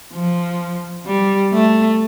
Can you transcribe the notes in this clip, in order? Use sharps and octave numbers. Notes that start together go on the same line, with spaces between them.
F3
G3
A3